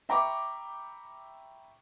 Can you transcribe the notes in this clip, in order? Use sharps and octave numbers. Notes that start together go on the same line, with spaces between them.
E5 G5 A#5 B5 C#6 D6